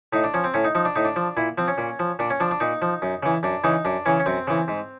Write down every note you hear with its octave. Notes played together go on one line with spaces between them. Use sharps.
A2 D#4
D4
F3 C#4
C4
A2 C#4
D#4
F3 D#4
D4
A2 D#4
D4
F3
A#2 E4
F3 C4
C#4
A#2
F3
A#2 D4
C#4
F3 D4
D4
A#2 D#4
F3
F#2
C#3 E3
F#2 D4
C#3 E3 D#4
F#2 D4
C#3 E3 C#4
C#4
F#2 C4
C#3 E3
G#2